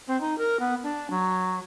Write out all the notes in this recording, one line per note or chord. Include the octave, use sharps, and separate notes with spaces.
C4
D#4
A#4
B3
D4
F#3